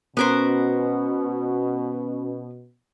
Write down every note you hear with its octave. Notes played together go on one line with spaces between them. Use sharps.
B2 B3 C#4 A#4 C5